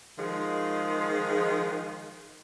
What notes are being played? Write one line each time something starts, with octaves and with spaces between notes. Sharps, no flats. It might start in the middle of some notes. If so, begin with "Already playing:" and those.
D#3 F3 G#3 G#4